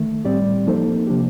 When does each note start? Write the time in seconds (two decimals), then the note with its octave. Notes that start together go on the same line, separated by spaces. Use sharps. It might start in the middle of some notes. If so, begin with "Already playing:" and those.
Already playing: D#3 A3
0.25 A2 G3 C4 G4 D5
0.67 F3 A#3 D#4 A4 C5
1.07 C3 F3 A#3 D4 G4